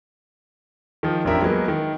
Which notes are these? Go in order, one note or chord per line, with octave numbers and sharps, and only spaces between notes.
D#3 F3
A1 F2 D4 G4 A#4 E5
F#3 G#3 A#3 B3
D#3